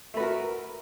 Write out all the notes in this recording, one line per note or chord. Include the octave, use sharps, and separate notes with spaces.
A3 F#4 A#4 B4